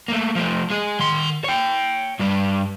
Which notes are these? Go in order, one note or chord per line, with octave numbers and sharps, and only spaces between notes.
A3 A#3
F3 A3
G#3 G#4
D#3 C6
C#5 G5
G2 G3